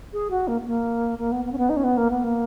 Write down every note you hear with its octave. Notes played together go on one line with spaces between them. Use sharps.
G#4
F#4
A#3
A#3
A#3
B3
B3
C#4
B3
D#4
C#4
B3
A#3
B3
A#3